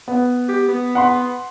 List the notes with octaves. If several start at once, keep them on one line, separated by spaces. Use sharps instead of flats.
B3
G4
B3
F#5 B5 C6